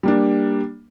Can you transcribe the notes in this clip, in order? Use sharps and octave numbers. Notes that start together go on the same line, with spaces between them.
G3 A#3 D4